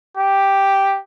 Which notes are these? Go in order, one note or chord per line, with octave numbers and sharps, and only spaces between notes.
G4